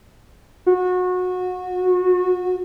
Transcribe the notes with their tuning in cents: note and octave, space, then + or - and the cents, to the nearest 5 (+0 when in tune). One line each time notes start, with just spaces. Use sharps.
F#4 -25